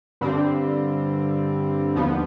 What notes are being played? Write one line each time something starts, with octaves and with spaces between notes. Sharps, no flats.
G2 D3 G3 C4
D#2 D3 F3 B3